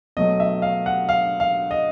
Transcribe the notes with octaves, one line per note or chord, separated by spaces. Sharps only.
B2 F#3 A3 D#5
E5
F5
F#5
F5
F5
D#5